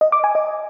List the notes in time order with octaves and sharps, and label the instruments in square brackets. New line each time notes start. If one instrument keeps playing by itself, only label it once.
[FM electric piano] D#5
D6
G#5
D#5